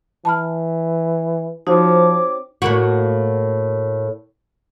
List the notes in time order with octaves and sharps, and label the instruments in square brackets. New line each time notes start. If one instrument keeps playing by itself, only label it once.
[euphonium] E3 [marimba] A5 B5 F6
[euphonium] F3 [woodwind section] C4 C#5 D6 [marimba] D#4 F#4
[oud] A2 A#3 F#4